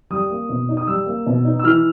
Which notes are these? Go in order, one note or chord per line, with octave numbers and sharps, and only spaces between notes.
G3 D#6
A#3
B2
D#4
D#6
G3 E6
A#3
B2
D#4
E6
E3 F6